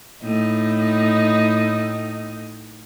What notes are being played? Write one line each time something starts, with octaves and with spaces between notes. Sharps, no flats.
A2 D#4